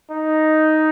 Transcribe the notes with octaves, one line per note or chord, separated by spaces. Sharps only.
D#4